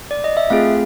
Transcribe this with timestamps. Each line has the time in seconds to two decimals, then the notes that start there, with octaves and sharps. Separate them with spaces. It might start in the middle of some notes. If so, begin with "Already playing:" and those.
0.11 D5
0.24 D#5
0.37 E5
0.50 A3 C4 F4 G#4 F5